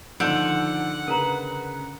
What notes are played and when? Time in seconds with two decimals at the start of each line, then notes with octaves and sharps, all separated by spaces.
0.20 D3 D#3 F3 F#5 E6 G6 D7
1.08 C#3 A#4 B4 A#5